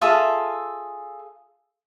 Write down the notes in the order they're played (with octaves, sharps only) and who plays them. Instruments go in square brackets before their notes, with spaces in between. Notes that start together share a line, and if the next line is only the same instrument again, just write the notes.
[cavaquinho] F4 G#4 A4 E5